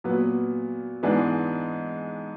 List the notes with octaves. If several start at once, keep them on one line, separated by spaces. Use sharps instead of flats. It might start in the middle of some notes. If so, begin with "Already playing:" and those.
A#2 F#3 B3
G#2 E3 G#3 B3 D4